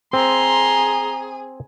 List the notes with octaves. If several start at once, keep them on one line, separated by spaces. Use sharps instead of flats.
C4 G#4 A#5 C6